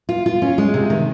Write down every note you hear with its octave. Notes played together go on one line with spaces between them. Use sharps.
F4
F4
C#4
G#3
C3
D#3